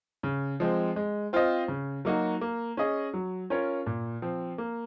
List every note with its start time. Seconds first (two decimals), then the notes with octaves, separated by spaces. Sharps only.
0.23 C#3
0.60 F3 G#3 C4
0.96 G#3
1.33 C4 F4 C5 D#5
1.68 C#3
2.05 F#3 A#3 D#4 F#4
2.41 A#3
2.77 C#4 G#4 D#5
3.14 F#3
3.50 C#4 F4 A#4 C#5
3.86 A#2
4.22 F3 C4
4.58 A#3